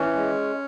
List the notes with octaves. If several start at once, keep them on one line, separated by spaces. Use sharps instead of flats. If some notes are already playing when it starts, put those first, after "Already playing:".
Already playing: E3 C#4
G#3